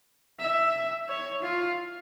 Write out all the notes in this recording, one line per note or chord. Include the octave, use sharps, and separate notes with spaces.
E5
C#5
F4